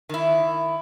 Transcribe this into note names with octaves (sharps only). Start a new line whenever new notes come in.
D#3 E4